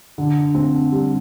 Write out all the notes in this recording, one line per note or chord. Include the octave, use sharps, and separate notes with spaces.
D3
C4
G3